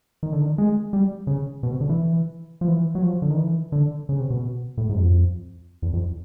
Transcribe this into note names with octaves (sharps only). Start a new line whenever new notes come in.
D#3
D3
D#3
G#3
G3
C#3
B2
C3
D3
E3
F3
E3
F#3
F3
D3
D#3
E3
D3
C#3
C3
B2
A2
G#2
F#2
F2
E2
F2